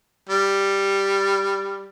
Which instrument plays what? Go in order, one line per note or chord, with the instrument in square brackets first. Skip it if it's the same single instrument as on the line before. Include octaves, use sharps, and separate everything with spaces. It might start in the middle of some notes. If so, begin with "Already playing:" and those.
[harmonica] G3